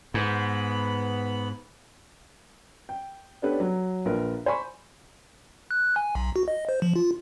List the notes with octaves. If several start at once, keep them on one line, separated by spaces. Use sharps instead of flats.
G#2 B3 B5
G5
B3 C#4 D4 G4 A4 B4
F#3
A#1 F4 A#4 B4
C5 G#5 B5 C#6
F#6
G#5
B1
F#4
D#5
C5
F3
F4